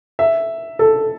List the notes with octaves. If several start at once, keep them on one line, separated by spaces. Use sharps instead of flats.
E5
A4